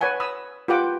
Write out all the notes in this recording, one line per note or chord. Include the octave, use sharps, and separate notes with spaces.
B4 C#5 F#5 G#5 A5
B5 D#6 E6
F4 G4 B4 F#5 G5 D6